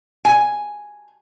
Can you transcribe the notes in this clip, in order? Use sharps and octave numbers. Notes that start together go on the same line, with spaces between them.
G#5